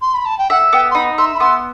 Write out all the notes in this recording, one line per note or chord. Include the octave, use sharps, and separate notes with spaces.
C6
B5
A5
G5
E5 F#5
B3 G5
C6
D#4 B5
E5 C6
B5
B3 C6